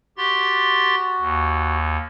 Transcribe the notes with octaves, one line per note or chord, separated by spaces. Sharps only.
F#4 G4 C6 A6
D#2